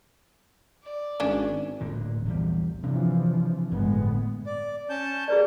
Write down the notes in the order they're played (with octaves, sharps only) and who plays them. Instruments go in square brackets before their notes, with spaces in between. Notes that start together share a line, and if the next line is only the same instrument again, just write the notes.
[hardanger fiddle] D5
[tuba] G#1 [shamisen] C#4 D4
[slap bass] D1 A#2 D3
A#1 E2 G3
[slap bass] C3 D4 [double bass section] E3 F3
[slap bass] G1 [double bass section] A2 G#3 B3
[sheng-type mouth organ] D5
C#4 A5 G6
[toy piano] G#4 B4 D5